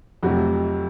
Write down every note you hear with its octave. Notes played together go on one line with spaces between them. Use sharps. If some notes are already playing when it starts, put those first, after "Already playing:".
F2 C3 F3 F#3 A3 F#4